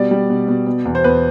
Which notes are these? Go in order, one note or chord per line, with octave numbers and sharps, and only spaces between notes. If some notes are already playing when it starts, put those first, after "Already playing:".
Already playing: B2 G3 D5
G3
B2
B2
B2
E2
C5
E2 B4